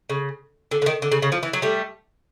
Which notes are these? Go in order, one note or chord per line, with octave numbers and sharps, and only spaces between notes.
C#3
D3
D3
D#3
D3
C#3
C#3
F3
E3
F#3
G3 A3